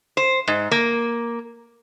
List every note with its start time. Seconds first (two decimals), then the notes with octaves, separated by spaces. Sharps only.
0.17 C5
0.48 G#2
0.71 A#3